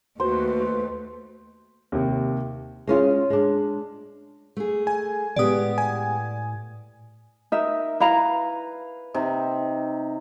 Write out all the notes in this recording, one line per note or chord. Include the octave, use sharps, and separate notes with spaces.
D#2 A3 F#4 B4 C5
D#2 C3
G#3 C#4 F4
G#3 D4
A3 G#4
G#5
A2 G#3 B3 G4 D5 D#6
G#5
D#4 A#4 E5
E4 B4 F5 A#5
C3 D#4